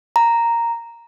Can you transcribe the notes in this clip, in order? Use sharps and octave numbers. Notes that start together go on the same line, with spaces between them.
A#5